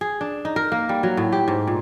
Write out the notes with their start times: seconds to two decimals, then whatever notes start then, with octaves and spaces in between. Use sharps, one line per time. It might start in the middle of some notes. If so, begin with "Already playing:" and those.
0.01 G#4
0.21 D4
0.45 D#4
0.56 A#4
0.72 A#3
0.89 G3
1.03 F#3
1.17 A2
1.33 G4
1.48 G#2
1.67 A#2